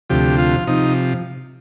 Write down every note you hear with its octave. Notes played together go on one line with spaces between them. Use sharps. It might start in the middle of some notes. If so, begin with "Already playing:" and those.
D2 C3 F3 G4
F4
C3 F3 D#4